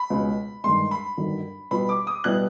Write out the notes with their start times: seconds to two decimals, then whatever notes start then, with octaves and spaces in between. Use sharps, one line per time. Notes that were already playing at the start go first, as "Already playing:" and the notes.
Already playing: B5
0.10 C#2 B2 G#3
0.64 G1 G2 D#3 G#3 C6
0.91 B5
1.17 G1 G2 D#3 F#3
1.71 B2 G3 B3 D4 F4 B5
1.89 D6
2.07 D#6
2.24 B2 G3 B3 E4 F#6